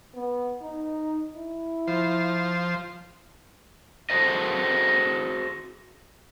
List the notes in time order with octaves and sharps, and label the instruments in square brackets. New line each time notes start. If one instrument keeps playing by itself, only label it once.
[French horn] B3
D#4
E4
[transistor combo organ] F3 C5
[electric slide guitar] F#4 G#4 A4 C5 D#5